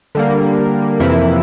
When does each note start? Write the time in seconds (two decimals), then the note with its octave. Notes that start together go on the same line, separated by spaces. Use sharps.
0.15 D3 G3 A#3
1.00 F2 C3 E3 A#3 E4